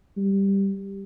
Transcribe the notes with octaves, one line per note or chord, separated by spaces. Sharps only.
G3